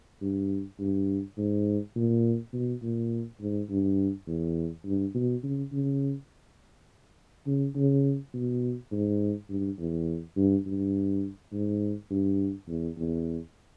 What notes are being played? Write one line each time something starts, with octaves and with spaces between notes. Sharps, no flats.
G2
G2
G#2
A#2
B2
A#2
G#2
G2
E2
G2
B2
C#3
C#3
C#3
C#3
B2
G#2
G2
E2
G2
G2
G#2
G2
E2
E2